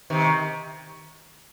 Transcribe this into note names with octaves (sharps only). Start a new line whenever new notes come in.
C3 D#3